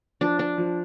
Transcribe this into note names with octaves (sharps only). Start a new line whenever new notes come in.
F3 D4
D4
F3